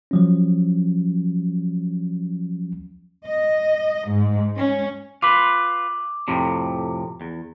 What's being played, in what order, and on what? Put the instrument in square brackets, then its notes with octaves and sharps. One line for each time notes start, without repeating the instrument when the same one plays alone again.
[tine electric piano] F3 F#3 C#4
[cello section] D#5
G#2
C#4
[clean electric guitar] F4 B4 [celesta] D6
[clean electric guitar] F2 A2 C3
E2